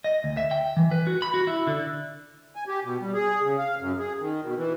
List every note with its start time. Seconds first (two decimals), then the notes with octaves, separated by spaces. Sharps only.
0.04 D#5
0.24 D2
0.37 E5
0.51 G5
0.77 E3
0.91 B4
1.07 F#4
1.22 B5
1.34 F#4
1.47 E4
1.67 D3
2.56 G#5
2.68 G4
2.84 B2
3.00 G3
3.14 G#4
3.42 C#3
3.58 F5
3.79 F#2
3.99 G#4
4.20 D#3
4.43 B2
4.56 E3